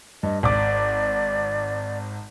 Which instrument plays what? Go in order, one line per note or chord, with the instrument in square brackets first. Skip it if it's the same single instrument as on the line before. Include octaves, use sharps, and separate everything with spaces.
[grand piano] G2 [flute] D#5
[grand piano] G#1 D6 [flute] D5